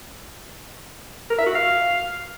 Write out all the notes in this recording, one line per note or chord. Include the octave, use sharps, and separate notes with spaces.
A#4
E5
F#4
F5